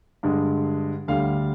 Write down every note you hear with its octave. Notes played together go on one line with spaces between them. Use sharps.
G2 D3 G#3
D2 D3 G3 F5